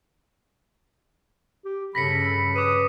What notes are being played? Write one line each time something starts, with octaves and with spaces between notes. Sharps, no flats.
G4
G2 C#3 A4 B5 A#6 B6 C#7
B4 D6 D#6 D#7